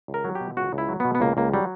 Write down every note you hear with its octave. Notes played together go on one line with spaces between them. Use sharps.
C#2
A#4
F#3
G4
B2
C#2 F#4
C#2
E4
F#3
B2 B3
B3
C#2 A#3
C#2 A#3
F#3 G3